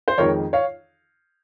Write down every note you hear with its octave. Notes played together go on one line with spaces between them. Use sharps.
C5
F2 D#3 G#3 A#4 C#5
C#5 F5